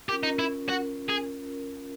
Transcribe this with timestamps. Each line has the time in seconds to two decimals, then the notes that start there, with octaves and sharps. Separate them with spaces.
0.09 C#4 F4 G4 A#4
0.23 D#4
0.39 E4
0.69 F#4
1.09 G#4